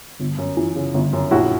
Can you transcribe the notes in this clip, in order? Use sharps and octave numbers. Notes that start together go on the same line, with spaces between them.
G1
F#2
E3
C#3
G1
F#2
A#1 E4 F#4